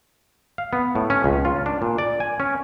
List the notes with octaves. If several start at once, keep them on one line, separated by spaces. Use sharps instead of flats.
F5
B3
A2
C#4
C#2
F4
D4
A#2
D5
G#5
C#4